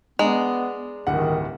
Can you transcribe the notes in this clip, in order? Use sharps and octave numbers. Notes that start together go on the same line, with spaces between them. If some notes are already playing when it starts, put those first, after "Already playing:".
G#3 B3 D4 A#5 F7
D1 G2 D#3 F#5